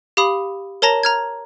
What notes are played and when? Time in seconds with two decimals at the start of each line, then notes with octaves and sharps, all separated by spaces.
0.17 G4 F5 B5 D#6
0.82 A#4 C#5 A5 A#5 A#6 E7
1.03 A#5 F6 G#6